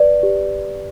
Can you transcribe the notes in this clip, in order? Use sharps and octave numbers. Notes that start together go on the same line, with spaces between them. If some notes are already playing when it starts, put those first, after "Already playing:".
Already playing: B4 D5
G4